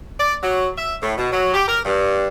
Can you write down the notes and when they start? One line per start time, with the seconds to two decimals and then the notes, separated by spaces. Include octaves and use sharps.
0.18 D5
0.42 F#3
0.77 E5
1.01 A2
1.17 B2
1.32 F#3
1.54 G4
1.67 A#4
1.84 G2